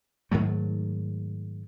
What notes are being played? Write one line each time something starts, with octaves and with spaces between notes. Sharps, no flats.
G#2 D#3 F#3 A3